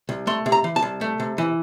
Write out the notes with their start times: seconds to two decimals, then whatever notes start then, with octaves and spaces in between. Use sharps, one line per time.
0.09 C2
0.27 A3 C6
0.46 C3
0.52 A#5
0.64 E3
0.76 A5
0.83 C2
1.01 A3
1.20 C3
1.38 E3